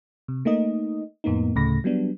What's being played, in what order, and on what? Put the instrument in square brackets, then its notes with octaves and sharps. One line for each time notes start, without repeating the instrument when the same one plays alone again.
[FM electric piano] C3
A3 A#3 D#4 D#5
F2 A2 A#3 B3 D#4
D2 A2 C#3 A3 B5 A#6
F#3 G3 B3 D4